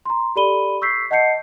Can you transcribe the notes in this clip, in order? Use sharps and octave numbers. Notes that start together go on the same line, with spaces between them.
A#5 C6
G4 A4 D5 B5 D#7 G7
C#6 E6 G6 B6 C7
D#5 F#5 A5 G6 C7 C#7